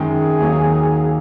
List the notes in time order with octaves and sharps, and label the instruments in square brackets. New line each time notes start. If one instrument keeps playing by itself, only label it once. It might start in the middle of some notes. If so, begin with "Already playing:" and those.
Already playing: [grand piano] F#2 D#3 G#3 [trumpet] G#4
[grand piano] D#2 D#3 F#3 A#3